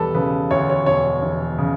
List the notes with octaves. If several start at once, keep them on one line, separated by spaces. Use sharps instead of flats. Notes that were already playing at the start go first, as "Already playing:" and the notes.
Already playing: E1 G3 A4 B4
C#3 B4
D2 C#5
C#5
E1 C#5
E1
C#3